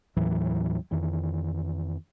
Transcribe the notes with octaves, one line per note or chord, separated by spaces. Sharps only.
D#2 A2 E3 F#3
F2 D#3 E3